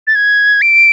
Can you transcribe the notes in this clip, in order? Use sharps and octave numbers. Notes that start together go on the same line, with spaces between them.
A6
G#6
D7